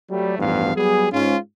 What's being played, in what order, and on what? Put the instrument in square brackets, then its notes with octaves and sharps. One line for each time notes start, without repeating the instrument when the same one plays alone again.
[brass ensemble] F#3 G3 A3
A1 E2 G2 F3 B3 F5
F#3 G3 B3 G#4
G#2 C#4 F4